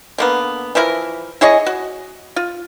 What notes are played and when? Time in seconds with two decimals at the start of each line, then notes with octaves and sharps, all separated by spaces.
0.18 D3 A#3 B3
0.75 E3 F3 E4 A#4
1.41 E4 G#4 C#5 D#5
1.66 F#4
2.36 F4